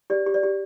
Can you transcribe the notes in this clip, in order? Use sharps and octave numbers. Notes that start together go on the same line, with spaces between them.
G4 D5
G4
D5
G4